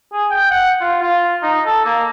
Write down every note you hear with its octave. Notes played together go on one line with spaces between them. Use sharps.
G#4
G5
F#5
F4
F4
D#4
A4
A#3